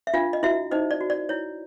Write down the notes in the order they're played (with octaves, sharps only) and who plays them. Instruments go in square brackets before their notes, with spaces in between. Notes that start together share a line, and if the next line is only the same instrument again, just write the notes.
[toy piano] E5
D4 F4 F5
D#5
E4 F#4 E5
D#4 C5 D#5
D5
F#4
D5
E4 C#5